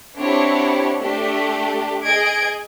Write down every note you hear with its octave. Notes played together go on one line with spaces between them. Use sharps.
C4 D4 E4 F#4 G4 C#5
A3 D4 G4
G#4 D#5 G#6 D7